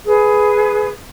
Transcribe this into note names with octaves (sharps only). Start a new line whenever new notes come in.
G#4 B4